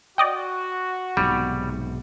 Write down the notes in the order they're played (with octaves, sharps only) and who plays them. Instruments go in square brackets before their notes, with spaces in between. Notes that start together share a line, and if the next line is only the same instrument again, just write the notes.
[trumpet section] F#4 [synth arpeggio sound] D5 D#5 G5
[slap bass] B1 G#2 C3 [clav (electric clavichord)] G3